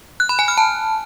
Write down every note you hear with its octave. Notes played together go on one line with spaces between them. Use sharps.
F#6
B5
G#5
F6
A5